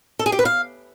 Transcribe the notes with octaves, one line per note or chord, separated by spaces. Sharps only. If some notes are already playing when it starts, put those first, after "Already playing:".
A4
G#4
G4
B4
F5